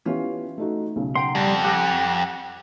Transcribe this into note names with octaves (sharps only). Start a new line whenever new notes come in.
E3 B3 C#4 F4 G4
A3 D#4 F#4
B1 C#3
F#5 G5 A#5 C6
F2 G3
G4 F#5 G#5 D6 E6 A#6